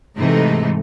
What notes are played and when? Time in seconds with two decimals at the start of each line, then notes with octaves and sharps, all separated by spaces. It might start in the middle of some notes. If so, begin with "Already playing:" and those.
0.18 G#2 C3 E3 A3 D#4